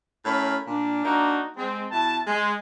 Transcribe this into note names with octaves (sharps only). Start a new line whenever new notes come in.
A2 C#4 A#4 B5
A#2 D4
A#3 D4 D#4 F#4
G#3 C4
B2 E4 A5
G#3